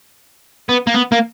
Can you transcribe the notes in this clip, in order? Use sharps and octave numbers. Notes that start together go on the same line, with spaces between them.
B3
A#3
B3
A#3